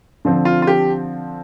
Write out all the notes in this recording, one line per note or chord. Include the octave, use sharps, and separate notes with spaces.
D3 F3 C4
F4
F4
G4